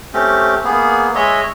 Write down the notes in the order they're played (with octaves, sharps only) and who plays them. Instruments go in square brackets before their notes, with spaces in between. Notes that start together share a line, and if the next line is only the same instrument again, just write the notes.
[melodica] A3 C4 C#4 G4
A#3 B3 G#4
G#3 C#5 D#5 E5